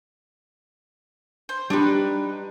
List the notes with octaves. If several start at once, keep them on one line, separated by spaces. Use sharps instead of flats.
C5
G3 D4 D#4 G4 B4